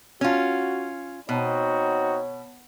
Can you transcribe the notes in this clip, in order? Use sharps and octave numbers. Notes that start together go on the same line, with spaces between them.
C#4 F4 F#4
B2 C4 D#4 F#4 C#5